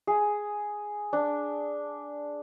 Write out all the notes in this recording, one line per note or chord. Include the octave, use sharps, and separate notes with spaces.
G#4
D4